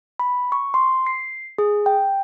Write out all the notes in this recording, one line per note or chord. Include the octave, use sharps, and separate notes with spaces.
B5
C#6
C6
C7
G#4
G5